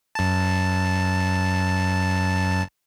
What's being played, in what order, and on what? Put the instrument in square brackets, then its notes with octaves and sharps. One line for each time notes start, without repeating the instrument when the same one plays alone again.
[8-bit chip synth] F#2 A5